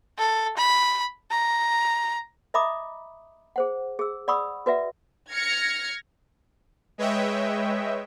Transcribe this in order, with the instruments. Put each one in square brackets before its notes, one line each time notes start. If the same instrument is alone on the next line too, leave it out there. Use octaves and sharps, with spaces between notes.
[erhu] A4
B5
A#5
[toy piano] D#5 E5 A#5 B5 D6 D#6
G#4 C5 F#5
G#4 E6
D5 F#5 B5 C#6 D#6 E6
F#4 B4 D5 E5 F#5
[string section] F6 G#6 A#6 C#7
[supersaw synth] G#3 B4 C#5 D#5 E5 G5